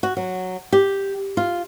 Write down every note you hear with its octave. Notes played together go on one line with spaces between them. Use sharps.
F#4
F#3
G4
F4